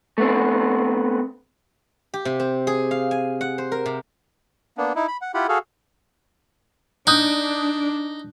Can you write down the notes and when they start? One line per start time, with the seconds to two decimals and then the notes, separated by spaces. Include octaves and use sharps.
0.18 A3 B3 C4
2.14 G4
2.25 C3
2.40 C4
2.67 G#4
2.91 F5
3.11 G#5
3.41 F#5
3.58 C5
3.72 A#4
3.86 C3
4.78 A#3 B3 D4
4.96 D#4 E4
5.08 B5
5.22 F#5
5.34 E4 F4 G4 F#5 B5
5.49 F#4 G#4 A4 F5
7.07 D4 D#4 D#6 F#6 G6